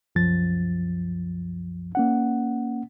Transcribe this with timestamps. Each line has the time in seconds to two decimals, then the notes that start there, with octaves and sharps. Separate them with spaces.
0.15 C2 F#2 F3 A6
1.95 A#3 C#4 F#5